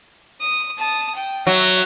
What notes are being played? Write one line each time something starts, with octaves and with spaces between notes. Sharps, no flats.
D#6
A5 D#6
G5
F#3 E5